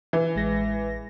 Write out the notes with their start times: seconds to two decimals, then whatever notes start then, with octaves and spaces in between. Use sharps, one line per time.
0.13 E3
0.36 A1 G#3 A#6